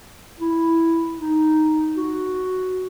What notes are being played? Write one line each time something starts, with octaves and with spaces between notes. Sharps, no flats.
E4
D#4
F#4